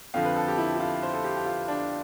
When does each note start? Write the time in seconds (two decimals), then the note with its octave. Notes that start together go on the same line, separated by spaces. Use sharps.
0.14 F2 D3 F3 F5
0.25 B4
0.36 A4
0.48 G4
0.58 E4
0.76 E4
0.80 F4
1.03 C5
1.13 A4
1.24 G4
1.36 G4
1.46 F4
1.68 D4